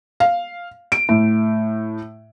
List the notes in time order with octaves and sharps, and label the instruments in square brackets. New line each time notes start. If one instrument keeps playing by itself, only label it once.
[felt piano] F5
D7
A2